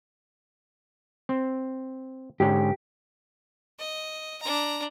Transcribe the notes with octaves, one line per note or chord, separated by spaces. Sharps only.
C4
G#2 D3 C#4 G4
D#5
D4 A#5